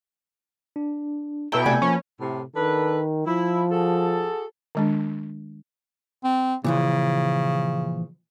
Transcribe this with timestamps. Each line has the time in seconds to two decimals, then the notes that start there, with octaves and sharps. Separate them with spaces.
0.76 D4
1.52 B2 E4 A4 C#5 G5 A#5
1.66 C3 A3 A4 B4 D5 G#5
1.82 F3 A#3 C#4
2.21 A2 C3
2.56 D#3 D4 A4 B4
3.27 F3 E4
3.71 F#4 G#4 A4
4.75 D#3 G#3 D4
6.24 C4
6.64 A#2 C#3 E3 F3